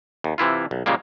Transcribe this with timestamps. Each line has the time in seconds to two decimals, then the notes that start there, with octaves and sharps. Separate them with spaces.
0.24 D#2
0.38 C3 E3 E4 F4
0.71 B1
0.86 A#2 C#3 G3 G#3 A#3